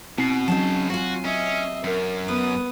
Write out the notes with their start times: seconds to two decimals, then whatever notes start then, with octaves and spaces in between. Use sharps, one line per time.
0.18 B2 C4 C7
0.48 C#3 F#3 C#4 D#4 A5
0.90 F#3 F4 F#4 G#5
1.25 C#4 D#5 E5
1.84 F#2 A#4
2.28 B3 B4 D#6